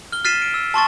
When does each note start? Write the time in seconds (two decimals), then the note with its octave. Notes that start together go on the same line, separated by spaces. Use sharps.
0.12 F6 G7
0.25 F6 A6 B6 C7 D#7 E7
0.42 D7
0.54 E6
0.74 A5 C6 C#6 A6